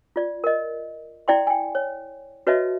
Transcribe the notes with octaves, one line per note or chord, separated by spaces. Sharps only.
F4 D5
A#4 D#5
E4 D5 G5 C6
G5 G#5
C#5
F#4 B4 C#5 D#5 E5 A5